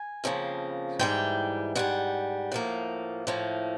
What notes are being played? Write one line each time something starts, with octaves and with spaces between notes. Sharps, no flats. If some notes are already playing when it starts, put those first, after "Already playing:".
Already playing: G#5
F2 C#3 F3 A#3
G#2 E3 G3 G5
G#2 E3 G3 F#5
A2 F3 A#3
A2 F3 A#3